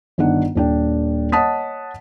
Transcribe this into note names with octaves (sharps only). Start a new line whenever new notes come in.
G1 D#3 D4 F#5
D#1 D4 G5
C#5 D#5 F#5 A5 D#6 B6